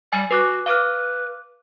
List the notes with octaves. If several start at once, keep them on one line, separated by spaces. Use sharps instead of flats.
G3 G#5
F#4 B4 D6 F#6
B4 F5 D6 F6